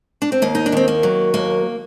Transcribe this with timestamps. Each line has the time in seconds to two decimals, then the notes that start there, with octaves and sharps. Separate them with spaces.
0.22 D4
0.32 C4
0.42 D#2 A#3
0.55 D#4
0.66 D4
0.72 D#3 C4
0.88 A#3
1.03 F#3
1.34 D#2 A#3